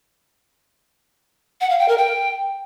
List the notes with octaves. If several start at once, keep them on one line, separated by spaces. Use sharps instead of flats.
F#5
F5
G5
A#4
G5